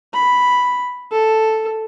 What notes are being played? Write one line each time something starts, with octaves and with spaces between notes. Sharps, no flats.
B5
A4